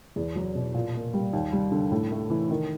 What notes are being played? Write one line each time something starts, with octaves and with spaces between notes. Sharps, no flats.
E2
F#3
B2
A#2
A#3
G3
D#2
G3
D3
A2
A3
E3
D#3